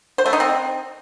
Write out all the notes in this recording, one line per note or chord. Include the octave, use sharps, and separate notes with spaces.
C5
A3
D#4
C4